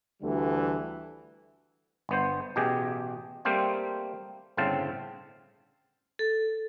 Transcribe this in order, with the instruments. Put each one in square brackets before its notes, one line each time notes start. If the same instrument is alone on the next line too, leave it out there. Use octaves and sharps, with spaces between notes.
[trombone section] D2 D3 E3 G3 A3
[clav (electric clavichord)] G1 B3 C5
A1 B2 G4 G#4
G3 A3 A#3 C4 C5 F5
G1 A2 C#3 C4 F5 A5
[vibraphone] A4